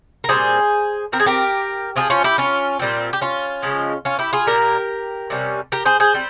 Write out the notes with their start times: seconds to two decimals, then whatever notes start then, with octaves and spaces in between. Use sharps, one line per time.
0.24 A#4
0.29 A#2 G3 C4 G#4 C5
1.12 F3 C4 A#4
1.20 G#4
1.26 G4 A#4
1.96 F3 G#3 C4 F4 G#4
2.10 C#4 F4
2.24 E4 G4
2.38 C#4 F4
2.79 A#2 G3 C4
3.13 G4
3.22 C#4 F4
3.63 C#3 F3 G#3
4.05 C#4 F4
4.19 E4 G4
4.33 F4 G#4
4.47 A#2 G3 A#3 G4 A#4
5.30 C3 G3 C#4
5.72 G4 A#4
5.85 G#4 C5
6.00 G#4 C5
6.15 G3 C4